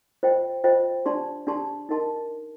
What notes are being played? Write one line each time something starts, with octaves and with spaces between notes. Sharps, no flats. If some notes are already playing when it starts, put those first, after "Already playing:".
F4 C5 D#5 G5
F4 C5 D#5 G5
D4 G4 D5 A5 C6
D4 G4 D5 A5 C6
D#4 A#4 D#5 A5 C6